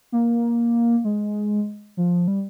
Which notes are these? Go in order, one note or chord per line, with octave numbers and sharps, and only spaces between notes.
A#3
G#3
F3
G3